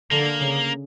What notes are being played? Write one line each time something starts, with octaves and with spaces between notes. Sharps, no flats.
D3 A#3
C#3